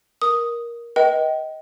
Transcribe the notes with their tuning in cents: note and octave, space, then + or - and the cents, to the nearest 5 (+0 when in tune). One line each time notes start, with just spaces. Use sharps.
A#4 +15 D#6 +0
B4 -35 D#5 +20 G5 -25